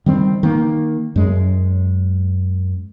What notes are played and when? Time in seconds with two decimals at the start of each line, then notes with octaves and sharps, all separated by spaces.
0.06 D#3 G3 C4
0.43 D#3 A#3
1.16 F#2 G#3